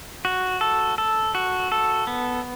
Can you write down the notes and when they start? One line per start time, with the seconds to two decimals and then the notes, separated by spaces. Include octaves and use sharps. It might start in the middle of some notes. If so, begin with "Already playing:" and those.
0.25 F#4
0.61 A4
0.98 A4
1.35 F#4
1.72 A4
2.07 B3